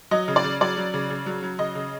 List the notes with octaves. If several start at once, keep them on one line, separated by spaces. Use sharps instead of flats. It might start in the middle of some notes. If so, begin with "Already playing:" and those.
F#3 D#5
C#3
D5
C#3
F#3 D5
F#3
C#3
C#3
F#3
F#3
C#3 D#5
C#3